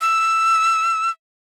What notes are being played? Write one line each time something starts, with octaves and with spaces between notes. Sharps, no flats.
E6